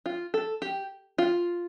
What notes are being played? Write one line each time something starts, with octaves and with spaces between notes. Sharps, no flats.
F4
A4
G4
F4